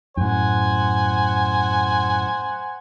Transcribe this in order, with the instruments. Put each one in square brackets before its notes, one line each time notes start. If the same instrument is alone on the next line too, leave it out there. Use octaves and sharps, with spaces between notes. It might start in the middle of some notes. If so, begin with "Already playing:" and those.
[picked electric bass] F#2 A2 [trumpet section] C5 F#5 G#5